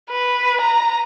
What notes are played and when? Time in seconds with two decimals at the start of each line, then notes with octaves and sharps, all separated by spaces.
0.11 B4
0.61 A#5